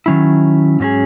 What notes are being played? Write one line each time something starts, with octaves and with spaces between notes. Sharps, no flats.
D#3 F#3 C#4 E4
G#2 F#3 C#4 G#4